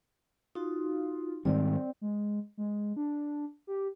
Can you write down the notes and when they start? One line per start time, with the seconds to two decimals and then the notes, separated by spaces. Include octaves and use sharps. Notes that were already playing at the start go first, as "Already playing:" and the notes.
0.55 D#4 F4 F#4
1.45 G#2 D#3 G3 C4 D5
2.01 G#3
2.58 G#3
2.96 D4
3.67 G4